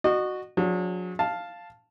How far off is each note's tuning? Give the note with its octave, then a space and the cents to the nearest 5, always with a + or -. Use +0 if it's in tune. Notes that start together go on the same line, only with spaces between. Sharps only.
F#4 +0 D#5 -35
F#3 -40 D4 -25 G#4 -25
F5 +0 A5 +0